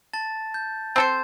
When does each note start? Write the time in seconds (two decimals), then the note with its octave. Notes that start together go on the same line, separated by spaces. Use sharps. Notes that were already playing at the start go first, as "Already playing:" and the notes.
0.13 A5 A6
0.54 G6
0.96 C4 A4 C5 G6